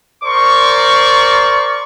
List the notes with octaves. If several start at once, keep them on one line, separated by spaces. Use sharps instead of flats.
A#4 C5 D5 C6 C#6